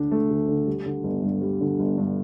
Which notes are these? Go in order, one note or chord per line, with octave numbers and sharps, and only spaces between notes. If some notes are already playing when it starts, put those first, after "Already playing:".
Already playing: D2 D3 A3 D4
A3
D2
D3
G3
D3
G1
G2
G3
D3
G1
G2